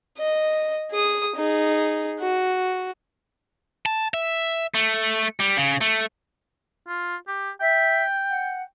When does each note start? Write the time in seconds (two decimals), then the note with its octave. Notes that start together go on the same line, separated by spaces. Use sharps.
0.18 D#5
0.91 G#4 D#6
1.36 D#4 G#4
2.20 F#4
3.86 A5
4.14 E5
4.74 A3
5.40 G3
5.57 C#3
5.81 A3
6.88 F4
7.28 G4
7.61 E5 G5
8.30 F#5